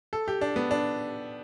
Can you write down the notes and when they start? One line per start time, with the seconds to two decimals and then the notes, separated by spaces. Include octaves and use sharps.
0.13 A4
0.28 G4
0.41 D4
0.56 B3
0.71 D4